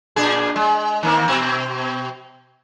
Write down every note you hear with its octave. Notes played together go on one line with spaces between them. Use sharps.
A#2 D4 G#4
G#3
D#3 A#3 C4
B2 C4